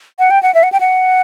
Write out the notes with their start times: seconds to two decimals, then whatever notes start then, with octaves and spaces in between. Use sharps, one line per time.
0.19 F#5
0.31 G5
0.43 F#5
0.54 E5
0.63 F#5
0.72 G5
0.80 F#5